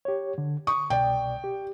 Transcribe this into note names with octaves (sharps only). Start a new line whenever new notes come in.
G4 C#5
D3
C#6 D#6
C2 B2 D5 G5
G4